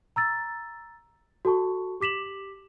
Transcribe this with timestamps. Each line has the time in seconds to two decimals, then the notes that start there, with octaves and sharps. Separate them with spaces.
0.16 A#5 E6 A6
1.45 F#4 A4 A5 C#6
2.00 G4 D6 B6 E7 F#7